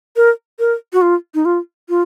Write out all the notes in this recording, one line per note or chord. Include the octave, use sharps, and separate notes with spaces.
A#4
A#4
F#4
F4
D#4
F4
F4